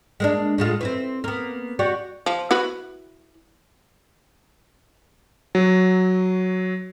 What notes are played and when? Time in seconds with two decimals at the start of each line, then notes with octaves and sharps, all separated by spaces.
0.20 G#3 A#3 D4
0.58 A2 G#3 F4
0.81 C4 E4 B4
1.24 A#3 B3
1.79 F#4 G4 D5
2.26 F3
2.51 E4 F#4 B4
5.55 F#3